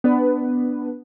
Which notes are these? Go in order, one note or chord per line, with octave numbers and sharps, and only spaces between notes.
B3 D4 B4